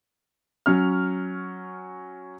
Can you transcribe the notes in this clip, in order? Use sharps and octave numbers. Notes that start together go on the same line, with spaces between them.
F#3 C#4 F6